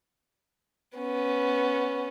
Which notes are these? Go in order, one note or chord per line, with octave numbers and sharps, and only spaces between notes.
B3 C#4